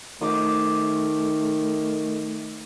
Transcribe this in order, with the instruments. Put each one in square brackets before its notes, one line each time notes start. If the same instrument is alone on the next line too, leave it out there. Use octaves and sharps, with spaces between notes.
[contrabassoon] D#3 [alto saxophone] A3 [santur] C5 D6 D#6